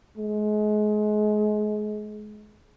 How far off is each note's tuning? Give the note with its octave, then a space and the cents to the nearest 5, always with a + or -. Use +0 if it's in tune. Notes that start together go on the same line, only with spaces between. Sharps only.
G#3 +30